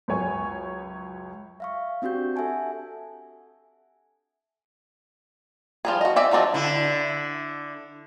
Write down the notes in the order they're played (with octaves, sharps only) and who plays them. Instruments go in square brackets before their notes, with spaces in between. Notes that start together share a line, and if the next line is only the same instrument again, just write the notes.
[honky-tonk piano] C#2 F#2 C#5 G#5
[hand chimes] E5 F5 C#6
C4 D4 F#4 G4 G6
A4 E5 F#5 G#5 A5
[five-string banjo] F3 G3 G#4
F#4 D#5
C4 D5 E5 G#5
F3 F#3 C4 D4 D#5
[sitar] D3 E4